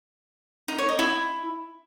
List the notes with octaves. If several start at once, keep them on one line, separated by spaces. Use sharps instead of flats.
D#4
C#5
D#5
E4